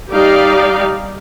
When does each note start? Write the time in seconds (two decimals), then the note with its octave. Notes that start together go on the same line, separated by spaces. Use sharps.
0.12 G3 D#4 G4 D5 F5